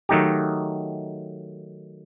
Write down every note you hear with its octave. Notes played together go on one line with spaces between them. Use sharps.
D#3 F#3 A3 D#4 G4